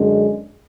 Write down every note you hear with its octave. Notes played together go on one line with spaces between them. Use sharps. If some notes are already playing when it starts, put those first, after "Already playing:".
Already playing: F#2 D3 G#3